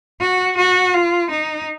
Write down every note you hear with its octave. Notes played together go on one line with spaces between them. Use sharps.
F#4
F#4
F4
D#4